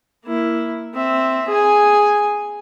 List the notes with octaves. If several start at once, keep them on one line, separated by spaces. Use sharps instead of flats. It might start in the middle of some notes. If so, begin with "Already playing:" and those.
A#3 E4
C4 E5
G#4 G#5